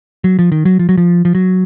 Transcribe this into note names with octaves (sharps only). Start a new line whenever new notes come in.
F#3
F3
D#3
F#3
F3
F#3
F3
F3
F#3